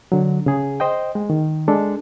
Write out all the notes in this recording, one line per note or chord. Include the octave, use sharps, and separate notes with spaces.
D3 F#3
C#3 G#4
C5 D#5 G5
G#3
D#3
G#3 D4 A4